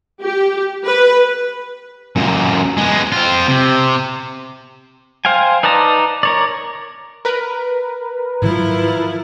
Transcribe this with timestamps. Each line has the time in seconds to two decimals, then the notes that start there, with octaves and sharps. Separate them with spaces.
0.22 G4
0.85 B4
2.16 F#2 A#2
2.78 G#3 B3
3.12 C4 F4
3.48 C3
5.25 C5 F5 G5 G#5
5.63 D#4 B4 D5 A5 A#5
6.23 A#4 C#5 D5
7.25 A#4 B4
8.42 G#2 D#3 F3 F#3 E4